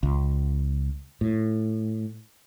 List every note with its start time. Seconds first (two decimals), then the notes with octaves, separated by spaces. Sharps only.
0.03 C#2
1.21 A2